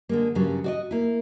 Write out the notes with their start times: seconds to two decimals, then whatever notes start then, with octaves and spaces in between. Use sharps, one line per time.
0.09 D3 G#3 A#3
0.35 G2 C#3 F#3 G3
0.64 F#4 D5 D#5
0.91 A#3 E4